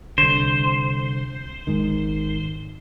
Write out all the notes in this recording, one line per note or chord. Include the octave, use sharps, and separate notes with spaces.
C2 D3 C5
G#1 G#2 D#3